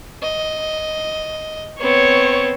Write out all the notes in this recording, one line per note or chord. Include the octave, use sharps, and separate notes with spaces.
D#5
B3 C4 C#5